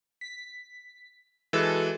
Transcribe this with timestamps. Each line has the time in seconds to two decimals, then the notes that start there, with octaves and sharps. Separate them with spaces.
0.21 B6
1.53 E3 G#3 F#4 A4